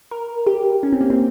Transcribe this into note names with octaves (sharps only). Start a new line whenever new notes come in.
A#4
G4
C#4
C4
A#3
C4